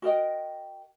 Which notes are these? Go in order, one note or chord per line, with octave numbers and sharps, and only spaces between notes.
F#4 A#4 D#5 G5